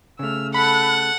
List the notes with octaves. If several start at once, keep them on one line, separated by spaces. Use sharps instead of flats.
C#3 A3 E6 F6
A4 F#5 B5 F#6